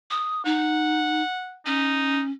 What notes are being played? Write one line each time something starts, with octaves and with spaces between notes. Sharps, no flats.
D#6
D#4 F#5
C#4 D#4